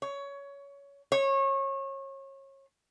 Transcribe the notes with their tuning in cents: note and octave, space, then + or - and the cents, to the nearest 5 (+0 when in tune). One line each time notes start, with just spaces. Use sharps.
C#5 +20
C#5 -30